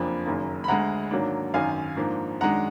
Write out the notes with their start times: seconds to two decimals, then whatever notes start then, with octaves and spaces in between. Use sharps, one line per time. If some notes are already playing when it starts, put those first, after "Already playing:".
Already playing: F#1 F2 F3 A#3 D4 G#5 B5
0.26 F#1 F#2 D#3 A#3
0.64 B5
0.68 D2 D3 G#3 F#5 A#5
1.11 G#2 D#3 F#3 A#3 D4
1.54 G#1 F#2 D#3 F5 G#5
1.97 G#2 F3 A#3 D4
2.41 F#2 D#3 G#3 D4 F#5 A#5